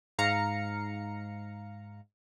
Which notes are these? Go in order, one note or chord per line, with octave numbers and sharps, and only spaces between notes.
G#2 F5 A#5 C#7